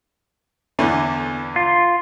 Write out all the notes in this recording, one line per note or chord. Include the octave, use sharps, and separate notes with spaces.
E2 D3 E3
F4